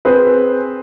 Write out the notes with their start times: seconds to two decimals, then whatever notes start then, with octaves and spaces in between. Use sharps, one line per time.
0.05 C4 G#4 B4